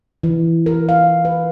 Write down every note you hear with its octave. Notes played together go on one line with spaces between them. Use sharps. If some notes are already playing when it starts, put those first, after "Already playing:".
E3
A#4
F5
B4